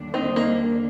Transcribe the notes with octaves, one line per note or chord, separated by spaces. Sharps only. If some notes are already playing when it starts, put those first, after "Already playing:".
Already playing: D#2 D3 G3 D4
C4 D#4
A#3